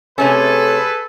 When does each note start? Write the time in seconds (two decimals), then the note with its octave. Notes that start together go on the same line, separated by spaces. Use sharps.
0.18 C3 A3 C#4 G#4 A4 B4